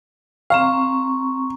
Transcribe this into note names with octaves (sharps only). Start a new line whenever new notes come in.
C4 F5 A#5 C#6